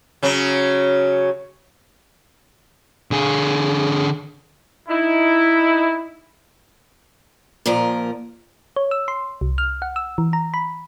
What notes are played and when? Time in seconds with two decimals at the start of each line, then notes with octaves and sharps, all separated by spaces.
0.23 C#3 F#3
3.11 D3 G#4
4.89 D#4 E4
7.66 A#2 F3 A#4
8.76 C#5
8.91 E6
9.08 C6
9.41 C2
9.58 F6
9.82 F#5
9.96 E6
10.18 E3
10.33 A#5
10.54 B5